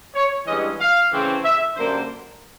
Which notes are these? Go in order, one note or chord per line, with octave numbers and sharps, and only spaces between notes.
C#5
G2 E3 G#3 C#4 D#5
F5
C#3 E3 A3 C4
E5
F#2 D3 G3 A#3 C5